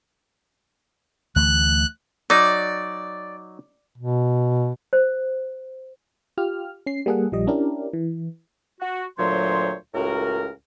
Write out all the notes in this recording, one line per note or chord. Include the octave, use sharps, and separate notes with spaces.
D2 E3 A3 F#6
F#3 D#4 D5
B2
C5
F4 G4 F6
C#4 C7
G3 A#3 G#4 A4 F#5
A#1 F3 G3 D#5
C#4 D4 E4 G4 A#4
E3
F#4
D2 A#2 F#3 C5 C#5 C6
C#2 A2 F#4 A#4